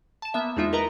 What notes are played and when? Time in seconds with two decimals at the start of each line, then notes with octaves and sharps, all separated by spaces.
0.22 A5 E7
0.34 A#3 B3 E5
0.57 E2 G#3 D#4 F4 E5
0.73 A#4 B4 D#5 A#5